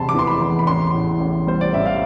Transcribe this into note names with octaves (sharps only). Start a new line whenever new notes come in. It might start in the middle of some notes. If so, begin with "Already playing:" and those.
Already playing: F1 E2 C3 A5 B5 C6
D6
E3 C6
B5
E2
B5
A1 C6
A2
A1
G3 C5
D5
A1 E5
F5